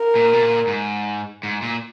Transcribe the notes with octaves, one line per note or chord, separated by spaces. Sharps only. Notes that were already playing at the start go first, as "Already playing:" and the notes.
Already playing: A#4
A#2
B2
A#2
G#2
G#2
A#2